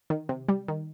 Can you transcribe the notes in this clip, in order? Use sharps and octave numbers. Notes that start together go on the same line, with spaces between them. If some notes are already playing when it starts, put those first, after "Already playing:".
D#3
C3
G3
D#3